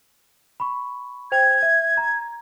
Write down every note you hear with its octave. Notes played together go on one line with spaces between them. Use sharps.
B5 C#6
C5 G5 G#6 F7
E5
A#5